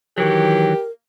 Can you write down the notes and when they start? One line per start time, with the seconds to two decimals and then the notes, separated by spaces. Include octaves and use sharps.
0.18 D#3 E3 F#3 G4 A#4